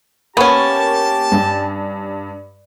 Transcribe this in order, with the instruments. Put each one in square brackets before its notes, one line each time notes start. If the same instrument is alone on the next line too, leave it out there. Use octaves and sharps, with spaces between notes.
[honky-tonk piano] A#3 C#6 [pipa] B3 C#4 [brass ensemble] G4 A5
[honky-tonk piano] G2